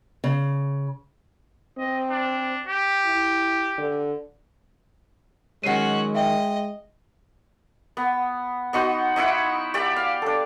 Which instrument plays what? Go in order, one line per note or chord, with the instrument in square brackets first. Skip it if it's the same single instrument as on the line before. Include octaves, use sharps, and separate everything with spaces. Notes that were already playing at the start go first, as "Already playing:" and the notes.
[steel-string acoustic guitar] C#3
[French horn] C4 [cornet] D#5
[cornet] D4
G4
[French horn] E4
D3
[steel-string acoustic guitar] D#3 F#3 [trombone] G#3 [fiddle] C#4 F#4 [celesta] F#5 C7 D#7
[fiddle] D#5 [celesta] E5 G5
[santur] B3
B3 D#4 F#4 C5
D#4 E4 E5 F#5
G4 D5 E5
F5
D4 A4